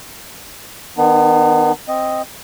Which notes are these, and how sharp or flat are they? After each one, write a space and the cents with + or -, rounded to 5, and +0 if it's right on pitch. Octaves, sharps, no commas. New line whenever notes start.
D#3 +0 B3 +0 D4 +45
C4 +0 D#5 +0